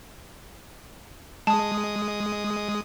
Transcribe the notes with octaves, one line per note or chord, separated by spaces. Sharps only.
G#3 A5 D#6